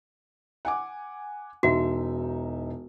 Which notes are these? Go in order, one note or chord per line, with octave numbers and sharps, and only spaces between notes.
F#5 G#5 D6
E1 D#4 F#4 E5